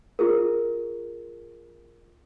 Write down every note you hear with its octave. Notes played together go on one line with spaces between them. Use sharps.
F4 G#4 A#4